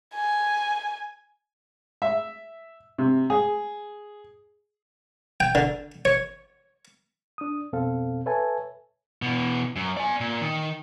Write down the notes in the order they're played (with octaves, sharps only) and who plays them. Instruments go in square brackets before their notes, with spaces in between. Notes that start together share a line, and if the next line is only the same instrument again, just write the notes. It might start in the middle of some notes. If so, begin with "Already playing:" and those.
[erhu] G#5
[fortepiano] E5
C3
G#4
[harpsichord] G5
D3
C#5
[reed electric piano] D4 D#6
F2 B2 C4 A4 F5
A4 B4 C#5 E5 G#5 A5
[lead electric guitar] B2 E3
F#2
D5 G#5
A#2
D#3